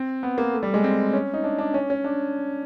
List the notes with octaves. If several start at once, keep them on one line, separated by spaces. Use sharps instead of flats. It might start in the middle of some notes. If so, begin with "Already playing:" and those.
Already playing: C4
B3
A#3
A3
G3
G#3
C4
C#4
D#4
D4
D4
C#4
C#4
D4